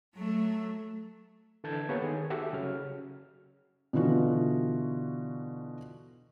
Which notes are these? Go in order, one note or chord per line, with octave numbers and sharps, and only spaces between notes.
F#3 A3
D3 E3 A4 A5 G6 G#6
A#3 B3 G4 C#5 F#5
D#3 G#4
F#4 G4 A4 E5
C#3 F#3 F6
B2 D3 E3 F4 F#4